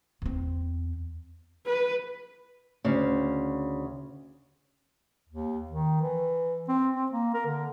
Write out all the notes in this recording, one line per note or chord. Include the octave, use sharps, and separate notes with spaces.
E2 C4
B4
D2 C#3
D#2
D#3
E3
C4
C4
A#3
A#4
D3